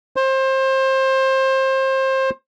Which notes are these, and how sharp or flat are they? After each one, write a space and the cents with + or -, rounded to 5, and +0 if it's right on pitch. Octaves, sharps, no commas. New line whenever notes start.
C5 +25